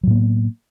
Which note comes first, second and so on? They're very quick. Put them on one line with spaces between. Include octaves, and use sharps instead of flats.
F#3 A2 A#3 B3